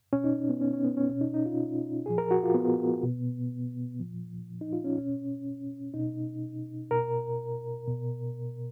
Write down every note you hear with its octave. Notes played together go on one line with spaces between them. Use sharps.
B2 C#4
D#4
B3
C#4
C#4
B3
C#4
B2 C#4
D#4
D#4
F4
A#2 F3 G#4
A#4
F#4
F4
B3
B2
A#2 F3
D#4
F4
C#4
B2 C#4
B2 D#4
B2 A#4
B2